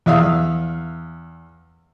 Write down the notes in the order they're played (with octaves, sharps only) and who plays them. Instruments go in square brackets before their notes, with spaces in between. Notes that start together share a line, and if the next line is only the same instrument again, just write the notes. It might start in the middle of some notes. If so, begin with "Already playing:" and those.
[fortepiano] E2 E5 F5 D#6